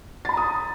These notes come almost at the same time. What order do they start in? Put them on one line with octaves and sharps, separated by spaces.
A6 B5 A#5 D#6